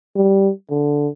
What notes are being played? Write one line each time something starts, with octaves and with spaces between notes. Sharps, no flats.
G3
D3